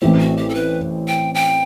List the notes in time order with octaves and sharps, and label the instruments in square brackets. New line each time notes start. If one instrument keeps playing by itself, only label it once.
[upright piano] A1 A2 E3 A3 C4 [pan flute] G4
[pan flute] F#4
G4
A4
B4
G5
G5